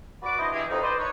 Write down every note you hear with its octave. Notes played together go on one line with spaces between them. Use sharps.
F#4 B4 D5 D6
D4 E4 B4 C5 D#5
B2 E3 F3 E4 G4 G#4
F2 B2 D#4
B4 C5 D5 D#5
D#4 B4 C#5